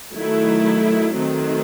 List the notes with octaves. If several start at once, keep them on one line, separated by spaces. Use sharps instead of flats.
D#3 F#3 A3 E4
D#3 F#3 A3 C4